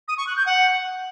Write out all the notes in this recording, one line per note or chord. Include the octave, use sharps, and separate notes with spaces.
D#6
C#6
F#6
G6
F#5